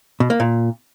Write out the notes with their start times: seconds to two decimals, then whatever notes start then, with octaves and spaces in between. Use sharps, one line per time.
0.20 B2
0.30 A#3
0.40 A#2